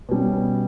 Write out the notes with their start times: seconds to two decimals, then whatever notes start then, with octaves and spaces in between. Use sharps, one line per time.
0.09 B2 G3 C#4